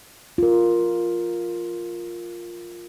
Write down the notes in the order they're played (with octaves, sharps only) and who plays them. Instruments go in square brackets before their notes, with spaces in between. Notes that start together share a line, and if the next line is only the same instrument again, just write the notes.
[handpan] F4 A#4